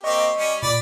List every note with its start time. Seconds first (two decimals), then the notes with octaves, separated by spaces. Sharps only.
0.04 A#3 C4 G4 D#5 C#6
0.36 G3 C#4
0.62 A#2 D5 B5